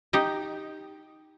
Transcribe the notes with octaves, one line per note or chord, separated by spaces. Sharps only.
D#4 G4 D#5